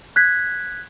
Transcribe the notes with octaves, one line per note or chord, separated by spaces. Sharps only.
F#6 G#6 B6